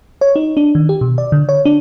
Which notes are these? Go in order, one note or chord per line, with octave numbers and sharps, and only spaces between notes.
C#5
D#4
D4
D#3
G4
B2
D5
D3
C#5
D4